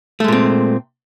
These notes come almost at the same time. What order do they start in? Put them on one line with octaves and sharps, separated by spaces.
A3 G#3 A#2 C4